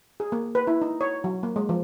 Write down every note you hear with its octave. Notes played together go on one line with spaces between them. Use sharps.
G#4
A#3
B4
E4
D#4
C#5
F#3
A#3
G#3
F3